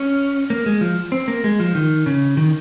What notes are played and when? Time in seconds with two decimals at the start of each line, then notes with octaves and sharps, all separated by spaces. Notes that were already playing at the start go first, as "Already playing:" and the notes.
Already playing: C#4
0.50 A#3
0.66 G#3
0.81 F3
1.12 C4
1.28 A#3
1.44 G#3
1.60 F3
1.75 D#3
2.06 C#3
2.37 D#3